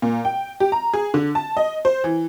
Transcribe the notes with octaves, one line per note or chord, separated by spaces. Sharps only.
A#2
G5
G4
A#5
G#4
D3
A5
D#5
C5
E3